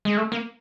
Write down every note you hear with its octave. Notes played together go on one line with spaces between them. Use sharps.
G#3
A3
A#3